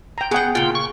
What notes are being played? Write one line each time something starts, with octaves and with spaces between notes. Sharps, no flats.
G5 A#5
B3 G#4 F#5 G5
A#2 C#3 F4 G5
C#6